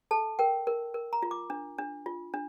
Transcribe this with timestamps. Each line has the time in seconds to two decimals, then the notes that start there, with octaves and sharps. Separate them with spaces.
0.11 A4 A5
0.39 A#4 G5
0.67 A#4
0.94 A#4
1.13 A#5
1.23 F4
1.31 D6
1.50 D4
1.78 D4
2.06 F4
2.34 D4